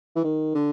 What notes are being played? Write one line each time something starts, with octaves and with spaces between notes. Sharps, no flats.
E3
D#3
D3